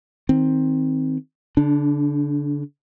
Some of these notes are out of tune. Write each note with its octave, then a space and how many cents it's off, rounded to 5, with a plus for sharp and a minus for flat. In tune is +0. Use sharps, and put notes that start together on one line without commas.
D#3 +20 C4 +5
D3 -35 D4 +0